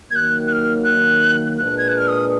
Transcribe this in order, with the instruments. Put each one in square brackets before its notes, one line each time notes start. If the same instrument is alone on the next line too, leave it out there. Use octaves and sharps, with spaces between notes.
[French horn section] D#3 F#3 A#3 [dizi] F#6 G#6
[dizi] F#6
F6
F#6
[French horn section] A#2 G#3 D4 G#4 B4 [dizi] F#6
[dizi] G#6
F#6
F6
D#6